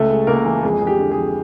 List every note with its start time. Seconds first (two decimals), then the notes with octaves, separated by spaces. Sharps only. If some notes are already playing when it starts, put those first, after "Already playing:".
Already playing: C#2 A3 A4
0.10 G#3
0.27 C#2 A#3 A#4
0.45 E3
0.63 F2 G#3 G#4
0.79 F2 G#4
0.87 G4
0.99 D3
1.11 G#3 G#4
1.17 F2